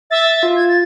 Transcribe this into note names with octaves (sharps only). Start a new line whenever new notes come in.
E5 A6
F4
G#6
A6